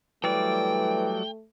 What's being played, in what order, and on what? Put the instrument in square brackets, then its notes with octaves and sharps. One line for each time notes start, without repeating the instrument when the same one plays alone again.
[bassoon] E3 [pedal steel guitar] F#3 G3 D5 [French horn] A3 [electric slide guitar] G5